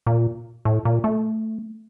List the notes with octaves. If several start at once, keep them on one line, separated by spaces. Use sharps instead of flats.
A#2
A2
A#2
A3